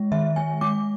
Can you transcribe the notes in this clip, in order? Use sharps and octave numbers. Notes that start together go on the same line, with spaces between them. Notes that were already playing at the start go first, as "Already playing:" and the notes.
Already playing: G#3
D#3 E5
G#3 G#5
G#3 D6